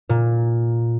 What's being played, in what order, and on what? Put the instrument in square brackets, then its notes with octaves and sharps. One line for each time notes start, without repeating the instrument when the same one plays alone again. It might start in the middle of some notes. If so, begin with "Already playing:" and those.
[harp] A#2